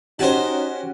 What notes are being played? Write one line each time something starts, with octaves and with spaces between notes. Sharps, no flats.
C#4 D#4 F#4 G4 C5 G#5 A5